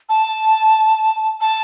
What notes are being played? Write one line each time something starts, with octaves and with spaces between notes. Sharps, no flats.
A5
A5